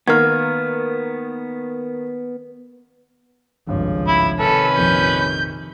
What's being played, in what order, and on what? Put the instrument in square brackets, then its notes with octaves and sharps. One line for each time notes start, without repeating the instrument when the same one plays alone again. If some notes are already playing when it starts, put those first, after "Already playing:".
[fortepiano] D#3 [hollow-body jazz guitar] A#3 B3 [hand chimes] F6 G#6
[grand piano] G#1 G2 C#5 [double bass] C#2 F3
[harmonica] E4 B5
[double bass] C3 D#3 [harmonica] C#4 B4 [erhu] A4
[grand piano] A#1 F2 [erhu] G6